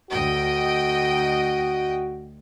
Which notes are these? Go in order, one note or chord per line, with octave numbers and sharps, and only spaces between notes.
D2 F#4 D#5 G5